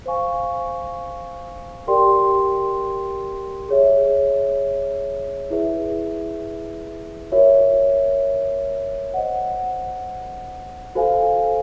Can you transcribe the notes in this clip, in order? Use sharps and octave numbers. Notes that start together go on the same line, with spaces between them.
C5 F5 G#5 C#6
G4 A#4 D5 G5 C6
G#4 C#5 E5
E4 G#4 B4 E5
F#4 A#4 C#5 E5
C5 D#5 F#5
F#4 A4 C5 F5 G#5